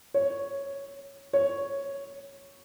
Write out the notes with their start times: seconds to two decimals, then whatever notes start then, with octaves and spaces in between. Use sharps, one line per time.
0.14 C#5
1.33 C#5